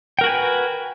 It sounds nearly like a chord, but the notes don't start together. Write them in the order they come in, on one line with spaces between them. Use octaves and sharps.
G5 A#4 F#4 G#5 B4